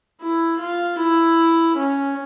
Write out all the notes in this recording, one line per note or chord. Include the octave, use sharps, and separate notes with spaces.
E4
F4
E4
C#4